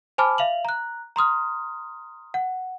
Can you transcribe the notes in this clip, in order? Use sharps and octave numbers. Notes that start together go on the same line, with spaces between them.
C5 G#5 A5 B5 D6 F6
E5 F5 F7 F#7
A#5 F#6
A#5 C6 D#6 F6
F#5